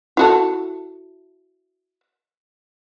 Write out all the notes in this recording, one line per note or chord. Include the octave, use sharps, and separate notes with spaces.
E4 F#4 A4